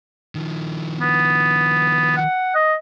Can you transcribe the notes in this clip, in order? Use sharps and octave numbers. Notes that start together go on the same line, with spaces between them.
D#3 F3
B3
F#5
D#5